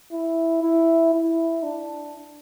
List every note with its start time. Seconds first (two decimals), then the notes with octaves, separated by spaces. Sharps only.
0.12 E4
0.62 E4
1.14 E4
1.63 D4